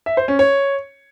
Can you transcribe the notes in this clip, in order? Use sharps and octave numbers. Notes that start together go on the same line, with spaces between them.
E5
C5
C#4
C#5